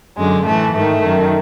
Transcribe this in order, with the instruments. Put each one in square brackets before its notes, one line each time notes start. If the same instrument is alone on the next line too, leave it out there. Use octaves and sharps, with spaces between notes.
[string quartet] F#2 D3 G#3
A2 E3 A3
G#2 D#3 A3
F#2 D#3